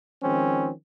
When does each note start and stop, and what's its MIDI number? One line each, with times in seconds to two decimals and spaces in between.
0.22 0.70 51
0.22 0.70 53
0.22 0.70 56
0.22 0.70 60
0.22 0.70 61